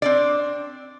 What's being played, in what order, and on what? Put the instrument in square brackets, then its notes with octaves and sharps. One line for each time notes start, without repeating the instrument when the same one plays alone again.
[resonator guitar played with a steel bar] C4 D4 D5